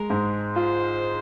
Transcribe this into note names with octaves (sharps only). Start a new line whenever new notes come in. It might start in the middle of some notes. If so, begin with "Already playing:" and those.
Already playing: G#3 A#4
G#2
F4 C5